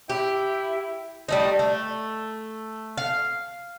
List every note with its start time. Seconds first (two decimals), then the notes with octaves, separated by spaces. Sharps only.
0.10 E4 G4 G5
1.29 G3 A3 D#4
1.59 A3
2.98 F5